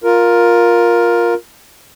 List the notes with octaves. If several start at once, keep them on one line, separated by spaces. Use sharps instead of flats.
F4 A#4